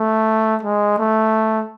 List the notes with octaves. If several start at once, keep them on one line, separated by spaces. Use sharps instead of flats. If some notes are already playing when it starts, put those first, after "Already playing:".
Already playing: A3
G#3
A3